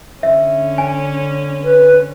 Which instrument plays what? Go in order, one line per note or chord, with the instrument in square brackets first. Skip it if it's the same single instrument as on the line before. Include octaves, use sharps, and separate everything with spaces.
[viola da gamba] D3 C#4 [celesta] E5
[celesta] G#5
[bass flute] B4